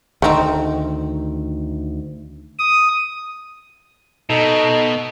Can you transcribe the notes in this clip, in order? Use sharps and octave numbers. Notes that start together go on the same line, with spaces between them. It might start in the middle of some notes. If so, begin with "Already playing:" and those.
D2 D#3 A3 C4 D#4
D#6
B2 D#4 A4